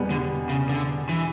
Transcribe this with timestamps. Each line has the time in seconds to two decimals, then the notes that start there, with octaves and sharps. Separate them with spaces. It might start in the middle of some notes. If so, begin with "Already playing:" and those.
Already playing: E2 B2 G3 B3
0.10 D3
0.49 C#3
0.69 D3
1.09 E3